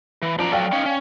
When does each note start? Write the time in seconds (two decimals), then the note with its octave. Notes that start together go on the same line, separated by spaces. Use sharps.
0.22 E3
0.38 F#2 F3 D5 A#5
0.52 F#3 F#4 A4 D5 F5 G5
0.72 C#4 D#4 C#5
0.86 C#4